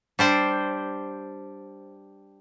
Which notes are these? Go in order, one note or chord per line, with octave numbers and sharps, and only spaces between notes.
G3 D4 C5